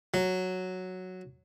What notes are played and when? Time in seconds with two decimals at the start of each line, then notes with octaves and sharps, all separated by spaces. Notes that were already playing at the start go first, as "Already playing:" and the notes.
0.14 F#3